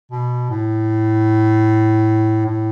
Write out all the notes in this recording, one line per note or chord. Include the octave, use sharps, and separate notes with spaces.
B2
A2
A2